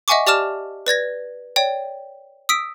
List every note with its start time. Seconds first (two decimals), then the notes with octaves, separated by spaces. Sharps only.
0.08 D#5 E5 F#5 G#5 C#6 D6
0.27 G4 D5 A5 D6 F6 E7
0.87 B4 D5 G#6 A#6
1.56 C#5 D5 G5
2.49 D#6 E6 B6 D7